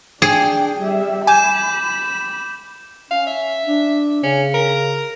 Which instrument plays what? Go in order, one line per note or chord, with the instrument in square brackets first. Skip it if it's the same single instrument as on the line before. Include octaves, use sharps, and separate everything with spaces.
[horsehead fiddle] D4 G5 [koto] G#4
[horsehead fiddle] G3 E5
[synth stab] G#5 [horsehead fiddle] B5 [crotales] D6 G6 E7
[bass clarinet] C#4 [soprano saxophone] F5
[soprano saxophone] E5
[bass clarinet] D4
[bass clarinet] C#3 [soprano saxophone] C#4
[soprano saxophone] A#4